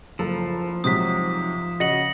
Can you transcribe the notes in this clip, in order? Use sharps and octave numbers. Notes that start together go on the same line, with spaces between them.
F#1 F3 A4
G#2 C3 F#3 D#6 B6
C#3 F#4 D#5 A#6 C#7 F#7